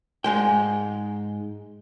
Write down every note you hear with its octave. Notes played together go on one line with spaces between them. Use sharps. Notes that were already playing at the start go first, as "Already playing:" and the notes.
G#2 G#3 G5